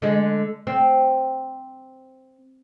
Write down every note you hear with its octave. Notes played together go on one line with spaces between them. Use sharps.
D3 G#3
C4